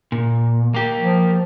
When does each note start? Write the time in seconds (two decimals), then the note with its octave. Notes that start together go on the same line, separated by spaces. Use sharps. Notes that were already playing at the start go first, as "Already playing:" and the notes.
0.12 A#2
0.74 A#3 G4
0.98 F3